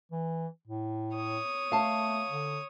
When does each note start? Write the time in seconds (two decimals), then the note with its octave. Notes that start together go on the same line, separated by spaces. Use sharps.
0.12 E3
0.68 A2
1.15 C#5 D#6
1.72 A3 F5 A5
2.28 D3